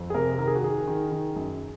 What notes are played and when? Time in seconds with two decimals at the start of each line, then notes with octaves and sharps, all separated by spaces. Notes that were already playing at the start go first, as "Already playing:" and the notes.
Already playing: F2
0.10 G#4
0.14 C3 A#4
0.39 D#3 A#4
0.47 G#4
0.55 F#4
0.63 D#3 G#4
0.87 D#3
1.12 D#3
1.36 F#2